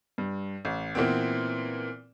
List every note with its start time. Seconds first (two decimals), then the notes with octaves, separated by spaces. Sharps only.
0.18 G2
0.65 A1
0.95 A#2 E3 B3 C4